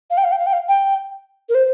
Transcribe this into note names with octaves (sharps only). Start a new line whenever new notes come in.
F5
G5
F5
G5
F5
G5
F5
G5
A#4
C5